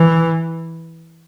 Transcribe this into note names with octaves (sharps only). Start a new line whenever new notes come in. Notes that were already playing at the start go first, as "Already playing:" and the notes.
Already playing: E3